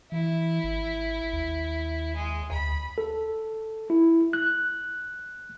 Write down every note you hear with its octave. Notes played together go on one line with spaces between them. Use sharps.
E3 E4
G#1
D#2
G#3
D2 B5
A4
E4
F#6